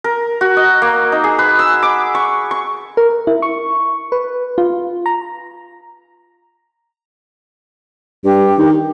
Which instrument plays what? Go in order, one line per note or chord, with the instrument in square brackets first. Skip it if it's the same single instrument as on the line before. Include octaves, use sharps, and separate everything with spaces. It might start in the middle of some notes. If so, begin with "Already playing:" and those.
[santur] A#4
F#4
D#5
A#3
D#4
G#4
B4
E6
D6
C#6
C#6
[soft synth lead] A#4
E4
C#6
B4
F4
A#5
[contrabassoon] G2 [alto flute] G4
[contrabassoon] D#3